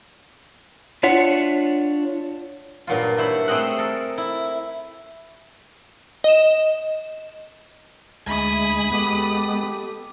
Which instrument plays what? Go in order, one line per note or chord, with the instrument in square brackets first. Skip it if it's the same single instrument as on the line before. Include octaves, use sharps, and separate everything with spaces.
[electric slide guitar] D4 F4 C#5 E5 F#5
[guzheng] G2 A#2 F#3 F4
E4 C5 C#5 B5
A3 C4 G#4 D#5 F#5
A4 A#4
E4
[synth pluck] D#5 E7
[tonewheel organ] D2 G#3 G#5 [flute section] E5 [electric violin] B5 D#6
[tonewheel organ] G#3 B3 [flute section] G4 A4 D6